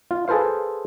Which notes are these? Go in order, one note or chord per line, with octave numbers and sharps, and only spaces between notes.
F4
G#4 A4 B4 C5 F5